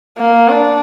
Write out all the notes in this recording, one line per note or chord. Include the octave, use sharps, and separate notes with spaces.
A#3
D4